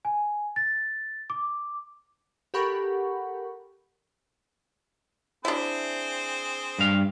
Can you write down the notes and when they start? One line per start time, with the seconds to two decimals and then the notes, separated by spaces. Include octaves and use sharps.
0.05 G#5
0.56 A6
1.30 D6
2.54 G4 A4 A#4 F#5 B5 C#6
5.45 C4 D4 E4 G#4 C5
6.78 G2 F5